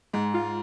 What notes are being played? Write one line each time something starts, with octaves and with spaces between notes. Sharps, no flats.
G#2 G#3
F4